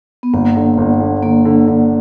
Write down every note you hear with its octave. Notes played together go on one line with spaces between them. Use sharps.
B3
G1 A#3
D3
G1
D3
D3 A#3
D3
D3